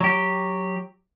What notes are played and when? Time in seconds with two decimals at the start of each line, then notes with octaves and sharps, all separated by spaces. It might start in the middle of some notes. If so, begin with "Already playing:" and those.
0.01 F#3 G4